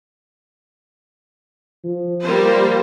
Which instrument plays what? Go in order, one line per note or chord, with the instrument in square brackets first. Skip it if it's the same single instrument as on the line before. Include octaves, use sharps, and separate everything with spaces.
[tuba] F3
[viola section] G3 A#3 C5